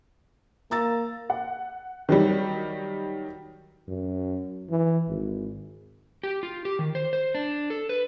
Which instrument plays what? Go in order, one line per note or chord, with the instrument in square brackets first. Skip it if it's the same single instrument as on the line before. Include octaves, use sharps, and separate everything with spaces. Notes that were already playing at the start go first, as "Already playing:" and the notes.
[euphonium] A#3 [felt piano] A#5 E6 A6
[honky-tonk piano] F#5
D#3 F#3 G3
[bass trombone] F#2
E3
G#1
[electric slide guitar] G4
F4
G4
D#3
C5
C5
D4
A4
B4